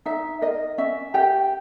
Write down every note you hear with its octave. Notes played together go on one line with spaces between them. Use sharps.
D#4 E5
A#4 D#5
C#4 E5
G4 A#4 G5